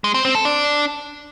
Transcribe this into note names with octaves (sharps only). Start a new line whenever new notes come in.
G#3
C4
C4
A4
D4